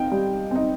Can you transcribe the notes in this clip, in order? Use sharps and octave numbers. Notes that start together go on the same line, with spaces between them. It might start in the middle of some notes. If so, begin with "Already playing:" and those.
Already playing: C4 D#4 F5 G5
G3
C4 D#4